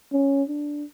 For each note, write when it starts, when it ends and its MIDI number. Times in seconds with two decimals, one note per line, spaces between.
0.13 0.43 61
0.48 0.84 62